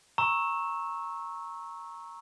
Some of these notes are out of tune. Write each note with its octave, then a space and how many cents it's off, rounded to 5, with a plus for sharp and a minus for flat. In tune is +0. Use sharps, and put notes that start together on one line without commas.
A#5 +0 C#6 -15 E6 -15